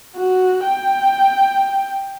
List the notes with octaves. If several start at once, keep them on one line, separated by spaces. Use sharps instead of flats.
F#4
G5